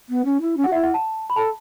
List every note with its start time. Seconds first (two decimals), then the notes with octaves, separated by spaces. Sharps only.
0.09 B3
0.25 C#4
0.41 E4
0.57 C#4
0.64 F#4 F#5
0.72 E4 E5
0.83 F#5
0.94 A5
1.30 B5
1.36 A4 A5